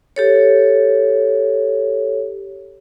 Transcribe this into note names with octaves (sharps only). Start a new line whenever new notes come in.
G4 A4 C#5